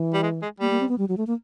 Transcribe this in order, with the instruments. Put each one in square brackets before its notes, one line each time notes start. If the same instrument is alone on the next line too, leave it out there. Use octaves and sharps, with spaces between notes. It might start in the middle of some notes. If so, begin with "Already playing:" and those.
Already playing: [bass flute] E3
[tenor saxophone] G3
G#3
G#3
[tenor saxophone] G3 [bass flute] A#3
[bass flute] A#3
C4
B3
G3
F#3
A3
A#3